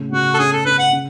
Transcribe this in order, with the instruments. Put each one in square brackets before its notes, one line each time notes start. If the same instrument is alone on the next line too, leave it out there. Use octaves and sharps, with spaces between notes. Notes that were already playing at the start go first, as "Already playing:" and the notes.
Already playing: [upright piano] A2 C#3
[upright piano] C#3 [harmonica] F#4
[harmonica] A4
[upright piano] C#4 [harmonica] G#4
[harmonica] A4
[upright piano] C#4 [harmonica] B4
[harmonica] F#5
[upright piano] C#3